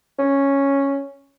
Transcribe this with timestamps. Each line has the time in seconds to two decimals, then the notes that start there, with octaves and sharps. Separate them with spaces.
0.19 C#4